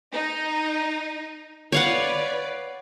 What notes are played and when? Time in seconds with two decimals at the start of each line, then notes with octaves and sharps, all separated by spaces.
0.12 D#4
1.72 B4 C#5 D5 F5 F#5